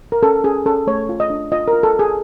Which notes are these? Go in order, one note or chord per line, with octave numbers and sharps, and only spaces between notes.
A#4
C#4 A4
C#4 G#4
C#4 A4
A3 C#5
F4
D#5
D4
F4 D#5
A#4
F4
A4
F4
G#4